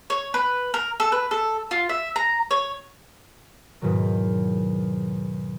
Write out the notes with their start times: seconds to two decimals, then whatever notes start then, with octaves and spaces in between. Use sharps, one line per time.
0.10 C#5
0.34 B4
0.74 A#4
1.00 A4
1.12 B4
1.31 A4
1.71 F4
1.89 E5
2.16 A#5
2.51 C#5
3.82 E2 G#2 B2 D#3 F#3